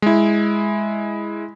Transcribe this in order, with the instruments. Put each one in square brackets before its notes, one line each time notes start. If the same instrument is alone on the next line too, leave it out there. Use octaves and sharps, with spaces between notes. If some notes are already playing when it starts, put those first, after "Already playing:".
[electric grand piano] G#3 E4